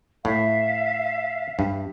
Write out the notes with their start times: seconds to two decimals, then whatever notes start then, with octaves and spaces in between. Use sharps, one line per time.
0.25 A2 E5 F5
1.59 G2